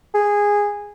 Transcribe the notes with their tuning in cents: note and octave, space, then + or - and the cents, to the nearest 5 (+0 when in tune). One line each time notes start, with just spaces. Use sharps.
G#4 -10